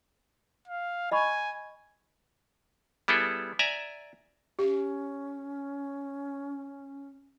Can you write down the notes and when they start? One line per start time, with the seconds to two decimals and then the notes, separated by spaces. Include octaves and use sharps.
0.68 F5
1.11 D#5 G#5 B5 C#6
3.08 G3 B3 E4 G#4 A4
3.59 D5 E5 G#5 A#5
4.59 C#4 G4